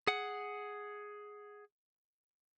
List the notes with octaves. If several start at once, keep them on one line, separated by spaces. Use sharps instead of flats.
G#4 F#5